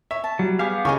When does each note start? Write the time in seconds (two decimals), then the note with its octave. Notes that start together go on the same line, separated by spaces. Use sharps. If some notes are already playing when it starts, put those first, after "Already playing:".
0.11 C#5 E5
0.24 A5
0.39 F#3 G3
0.59 B3 G4 G#4 F5
0.85 C#3 D#5 G#5 C#6